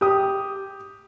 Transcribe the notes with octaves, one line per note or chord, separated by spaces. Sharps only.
G4 D#6